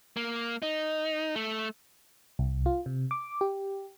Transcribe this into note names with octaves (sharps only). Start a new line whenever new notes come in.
A#3
D#4
A3
C2
F4
C3
D6
G4